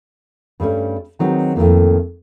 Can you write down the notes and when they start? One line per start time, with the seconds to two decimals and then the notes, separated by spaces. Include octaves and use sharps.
0.60 G2 G3 A3 C#4
1.19 D#3 F#3 C4 D#4 G#4 B4
1.56 F2 A2 C3 D#3 A#3